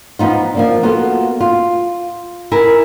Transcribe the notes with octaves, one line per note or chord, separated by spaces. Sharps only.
F3 B3 D#4 F4
F3 A#3 D4
A#3 B3 F4 F#4 A4
F4
E4 A#4 G#5